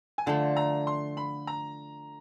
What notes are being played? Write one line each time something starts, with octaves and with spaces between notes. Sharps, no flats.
G#5
D3 F3 A3 A5
A#5
C6
B5
A#5